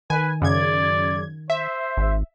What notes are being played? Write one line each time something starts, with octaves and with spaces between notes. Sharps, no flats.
D#3 B4 G#5
F#2 C#3 D5 G#6
C5 E5
G#1